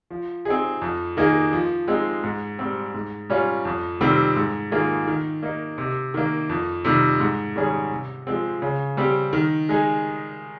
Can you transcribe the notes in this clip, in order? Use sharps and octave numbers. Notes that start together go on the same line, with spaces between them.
F3
C4 D#4 G#4
F2
D#3 A#3 D#4 G#4
F3
G#3 C4 D#4
G#2
G3 C4
G#2
G3 C#4 F4
F2
C3 D#3 G3 C4
G#2
D#3 A#3 F4 G#4
D#3
A#3 D#4
C3
D#3 A#3
F2
C3 D#3 G3
G#2
D#3 G3 C#4 G#4
C3
F3 G#3 C4
C#3
G3 C4 G4
D#3
G#3 D#4 G#4